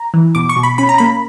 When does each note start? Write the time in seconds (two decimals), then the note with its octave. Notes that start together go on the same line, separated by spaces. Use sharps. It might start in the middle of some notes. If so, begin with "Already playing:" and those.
Already playing: A#5
0.14 E3
0.35 B2 D6
0.49 C#6
0.56 B2
0.63 B5
0.78 C#4 B5
0.89 A#5
0.98 A#3 B5